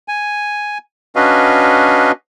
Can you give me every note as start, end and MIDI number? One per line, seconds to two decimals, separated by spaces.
0.08 0.78 80
1.16 2.12 61
1.16 2.12 62
1.16 2.12 66
1.16 2.12 71
1.16 2.12 75
1.16 2.12 77